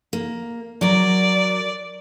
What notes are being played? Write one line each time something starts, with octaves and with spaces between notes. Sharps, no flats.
A#3
F#3 F#4 A#4 D5